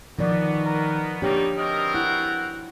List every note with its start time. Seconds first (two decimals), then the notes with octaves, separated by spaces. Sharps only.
0.19 B2 D#3 F3 B3 D#4 D5
0.65 A#4
1.22 F3 G3 A#3 D4 D#4 G4 C#5
1.58 B2 C4 A#4 D#5
1.94 E4 F#5